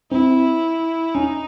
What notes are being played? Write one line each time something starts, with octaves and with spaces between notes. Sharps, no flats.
C4 E4
C#4 D#4